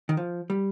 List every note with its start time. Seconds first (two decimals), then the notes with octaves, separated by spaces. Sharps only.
0.09 D#3
0.17 F3
0.50 G3